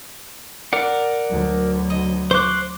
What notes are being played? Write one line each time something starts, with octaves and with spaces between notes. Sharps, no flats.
A#4 D5 F#5
D2 F#3
D#5
C5 C#6 D6 F#6